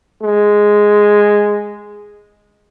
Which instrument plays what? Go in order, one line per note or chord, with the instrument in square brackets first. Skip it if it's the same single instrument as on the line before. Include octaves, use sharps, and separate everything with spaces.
[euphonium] G#3